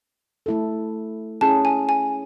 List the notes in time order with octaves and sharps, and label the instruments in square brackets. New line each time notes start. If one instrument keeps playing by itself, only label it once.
[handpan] A3 E4 A4
[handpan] C#4 E4 G#4 [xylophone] A5
[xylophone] G#5
G#5